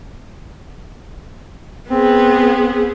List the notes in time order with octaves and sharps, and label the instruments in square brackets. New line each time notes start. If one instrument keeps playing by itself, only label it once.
[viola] B3 G#4 [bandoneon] C4